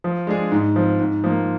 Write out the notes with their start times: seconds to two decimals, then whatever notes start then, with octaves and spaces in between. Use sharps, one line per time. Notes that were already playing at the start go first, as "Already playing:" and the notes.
0.04 F3
0.27 G#3 D4 G#4
0.52 G#2
0.76 F3 C4
1.00 G#2
1.24 F3 A#3